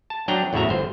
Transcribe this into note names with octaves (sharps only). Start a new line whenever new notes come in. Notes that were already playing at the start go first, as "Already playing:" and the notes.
A5
F#3 D4 G5 A#5
E2 A2 C#3 F#4 E5 A#5
G1 C5